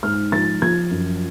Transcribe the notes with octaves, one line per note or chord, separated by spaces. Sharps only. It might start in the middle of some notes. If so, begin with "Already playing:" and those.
G#2 F6
F3 A6
F3 G#6
F#2